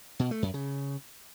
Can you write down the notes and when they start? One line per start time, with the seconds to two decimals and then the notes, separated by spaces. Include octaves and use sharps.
0.19 B2
0.31 A3
0.42 F#2
0.54 C#3